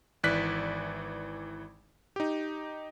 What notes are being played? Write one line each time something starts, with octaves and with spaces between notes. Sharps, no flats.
G#1 E3 D5 F#6 B6
D#4 G4